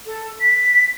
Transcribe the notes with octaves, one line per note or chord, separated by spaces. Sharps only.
A4
B6